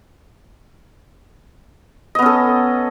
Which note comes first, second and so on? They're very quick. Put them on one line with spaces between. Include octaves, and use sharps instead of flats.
D#5 B3 C#4 A4